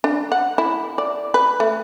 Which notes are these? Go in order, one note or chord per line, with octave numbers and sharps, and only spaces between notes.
D4
F#5
E4
D5
B4
A3